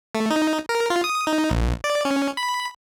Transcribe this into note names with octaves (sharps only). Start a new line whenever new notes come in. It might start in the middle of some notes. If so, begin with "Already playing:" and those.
A3
D#4
A#4
F4
D#6
D#4
A#1
D5
C#4
B5